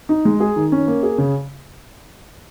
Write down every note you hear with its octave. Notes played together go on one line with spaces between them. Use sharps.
D#4
G#3
G#4
D#3
C#4
A#3
G#4
C#3